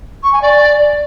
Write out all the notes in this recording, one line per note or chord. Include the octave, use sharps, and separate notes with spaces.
C#6
G#5
D5